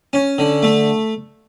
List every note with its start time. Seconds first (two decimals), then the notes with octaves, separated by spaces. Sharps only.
0.13 C#4
0.38 D3
0.63 A3